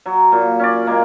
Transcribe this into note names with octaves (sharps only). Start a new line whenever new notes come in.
F#3
A#2
C#4 D5
G#3 A#3